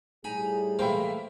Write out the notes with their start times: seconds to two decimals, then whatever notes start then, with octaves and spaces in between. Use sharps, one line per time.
0.24 A2 G3 D#4 G#4 G#5 A#5 B5
0.79 A1 G#3 A#3 A#4 C5 E5 G5 B5